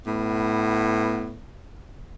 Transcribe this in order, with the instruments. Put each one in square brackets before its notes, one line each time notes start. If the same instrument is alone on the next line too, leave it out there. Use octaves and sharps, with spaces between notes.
[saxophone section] A2 B3